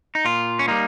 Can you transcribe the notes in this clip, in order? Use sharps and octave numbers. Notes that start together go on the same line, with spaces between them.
D#4
A#2 F4
C#4
G3 A#3 D#4